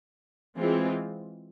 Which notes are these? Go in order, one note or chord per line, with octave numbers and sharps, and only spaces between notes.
E3 G#3 C4 F4